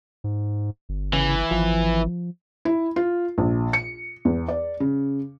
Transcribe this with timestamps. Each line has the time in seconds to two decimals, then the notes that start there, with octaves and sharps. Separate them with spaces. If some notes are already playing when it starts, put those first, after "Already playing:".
0.24 G#2
0.89 G1
1.13 C#3 E3
1.51 G#1 F3
2.65 E4
2.96 F4
3.38 A#1
3.73 C#7
4.25 E2
4.48 D5
4.80 C#3